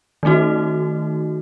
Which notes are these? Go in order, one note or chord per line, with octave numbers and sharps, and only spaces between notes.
D#3 A3 D#4 F#4